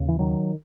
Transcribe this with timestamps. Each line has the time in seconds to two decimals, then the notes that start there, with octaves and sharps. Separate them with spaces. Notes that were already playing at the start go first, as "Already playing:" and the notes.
Already playing: D#2 C#3
0.08 E3
0.19 D#3 F#3